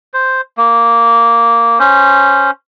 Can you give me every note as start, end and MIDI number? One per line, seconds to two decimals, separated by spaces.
0.14 0.41 72
0.58 1.79 58
1.79 2.51 61
1.79 2.51 72